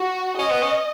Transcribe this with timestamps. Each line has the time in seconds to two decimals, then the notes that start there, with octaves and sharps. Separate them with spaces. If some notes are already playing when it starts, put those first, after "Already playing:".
Already playing: F#4
0.38 C#4 D#5
0.50 B3
0.62 C#4